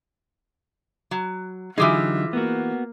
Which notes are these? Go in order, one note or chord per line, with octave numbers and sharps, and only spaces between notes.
F#3
D3 E3 F#3 D#4 F4 G4 G#4 E5
A#3 B3 F#4